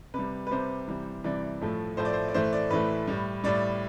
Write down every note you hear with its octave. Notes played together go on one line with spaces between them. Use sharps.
C3 G3 B4
B4
C3 G3 C5
C3 E3 G3
C3 E3 G3 D5
A2 F3 A3
A2 F3 A3 C5
D5
C5
D5
A2 E3 A3 C5
D5
A2 E3 A3 B4
A2 G3
A2 G3 D5